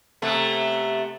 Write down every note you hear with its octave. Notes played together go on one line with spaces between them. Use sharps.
C3 A3 B3